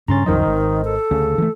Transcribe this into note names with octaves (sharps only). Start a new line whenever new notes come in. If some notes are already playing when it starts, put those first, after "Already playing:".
G2 C#3 C#4 A#5 C6 A6
C2 F#2 D#3 F3 A#4 C5 D#5
G#1
A4
D2 C#3 C#4
E3 A3